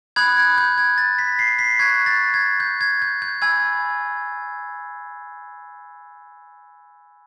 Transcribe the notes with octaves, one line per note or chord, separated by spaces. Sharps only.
B5 D#6 F#6 G#6
G#6
G6
G#6
A6
B6
C7
B6
C#6 F#6 G#6
A6
G#6
G6
G#6
G6
G6
G#5 B5 E6 G#6